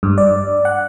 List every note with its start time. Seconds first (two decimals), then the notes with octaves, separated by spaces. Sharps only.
0.03 G2
0.18 D5
0.65 F#5